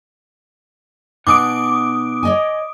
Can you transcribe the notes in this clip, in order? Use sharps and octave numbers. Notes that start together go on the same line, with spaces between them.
B2 D#4 F#5 G#5 D6 D#6 D7
C#5 D#5 G#5